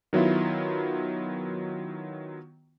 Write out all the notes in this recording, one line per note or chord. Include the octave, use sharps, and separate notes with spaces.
D#3 F#3 B3 E4 F4